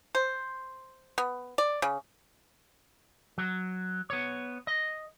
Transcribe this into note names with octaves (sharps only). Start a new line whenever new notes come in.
C5
B3
D5
C#3
F#3
B3 C#5
D#5